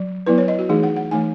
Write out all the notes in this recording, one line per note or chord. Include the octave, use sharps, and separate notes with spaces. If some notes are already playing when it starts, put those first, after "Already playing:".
Already playing: F#3
F#3 B3 E4 B4
C#5
D#5
F#4
E3 A3 D#4 G#4
F#5
F#5
E3 A3 D#4 G#5